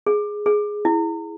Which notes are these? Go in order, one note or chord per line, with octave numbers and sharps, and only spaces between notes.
G#4
G#4
E4